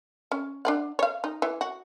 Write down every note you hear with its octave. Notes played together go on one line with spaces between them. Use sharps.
C#4
D4 D5 F#5
C#5 F5
D#4
E3
F#4